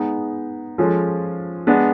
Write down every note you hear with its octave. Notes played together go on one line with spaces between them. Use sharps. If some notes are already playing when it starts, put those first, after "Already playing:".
Already playing: G#3 B3 D#4
F3 G#3 C#4 F4 A4
G#3 B3 D4